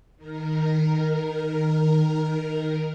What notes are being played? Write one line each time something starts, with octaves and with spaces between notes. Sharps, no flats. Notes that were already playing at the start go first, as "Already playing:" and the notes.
D#3 A#4